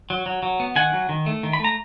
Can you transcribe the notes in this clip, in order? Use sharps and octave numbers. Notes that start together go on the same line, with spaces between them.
F#3
F#3
F#3
B3
D#3 F#5 G#5
F#3
D#3
A3
D#3
B5
A3 A#5